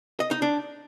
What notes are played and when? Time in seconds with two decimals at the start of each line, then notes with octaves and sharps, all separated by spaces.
0.20 D#5
0.31 D#4
0.42 D4